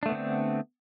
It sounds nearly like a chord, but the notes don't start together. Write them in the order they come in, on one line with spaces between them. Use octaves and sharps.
D4 A3 B3 D3 C4